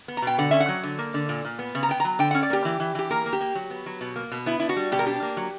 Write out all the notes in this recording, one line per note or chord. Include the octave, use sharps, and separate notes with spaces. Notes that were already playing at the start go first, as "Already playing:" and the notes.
B3
A#5
B2 G5
D3 F#5
C#4 E5
F#5
F#3
D3
A#3
D3
A#2
A#2
B3
C#3
A#5
B3 G5
F#3 A#5
D3 G5
C#4 F#5
D5
A#3 G4
E3
E3
E3 G4
A#3 A#4
A#3
G4
A#3
F#3
B3
F#3
B2
A#3
B2
B3 E4
D4 E4
F#4
G3
B2 G4
A#4
D4 G4
A#3
F#3